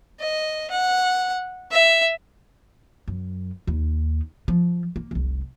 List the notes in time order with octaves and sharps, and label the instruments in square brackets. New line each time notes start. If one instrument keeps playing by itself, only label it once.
[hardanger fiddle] D#5
F#5
E5
[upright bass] F#2
D#2 D#4
F3
A#3
F1 C2